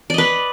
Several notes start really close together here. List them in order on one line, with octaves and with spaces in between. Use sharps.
D5 D#5 B4